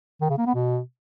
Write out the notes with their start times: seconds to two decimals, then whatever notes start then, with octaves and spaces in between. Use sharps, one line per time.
0.21 D#3
0.30 C#3
0.38 A#3
0.46 B3
0.55 B2